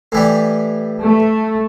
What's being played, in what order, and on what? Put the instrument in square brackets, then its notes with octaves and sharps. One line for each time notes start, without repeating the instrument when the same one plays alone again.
[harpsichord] A2 E3 G3
[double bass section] A3